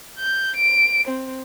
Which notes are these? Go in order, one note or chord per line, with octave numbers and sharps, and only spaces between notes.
G6
D7
C4